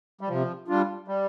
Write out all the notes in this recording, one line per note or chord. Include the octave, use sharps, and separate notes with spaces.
G3
C3 F3
G3 D4 F4
G3